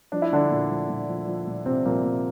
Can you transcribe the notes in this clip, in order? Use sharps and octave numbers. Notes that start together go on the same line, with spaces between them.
F3 D4
E4
D3 F3 D4
A#2
F3
A#2
F3
F3
A#2
C3 F3 C4
A#2 F3 A#3
A#2